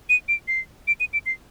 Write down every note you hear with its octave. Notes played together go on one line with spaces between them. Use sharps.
D#7
D7
C7
D7
D#7
D7
C7